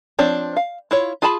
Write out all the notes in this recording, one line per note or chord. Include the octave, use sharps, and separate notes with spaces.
F3 C4 D4 C#5
F5
E4 F4 C#5
F4 G#4 G#5 A5 B5